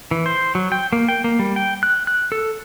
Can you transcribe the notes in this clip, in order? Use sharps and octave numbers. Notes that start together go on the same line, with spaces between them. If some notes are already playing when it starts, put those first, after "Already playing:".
E3
C5
F#3
G5
A#3
G5
A#3
G3
G5
F#6
F#6
A4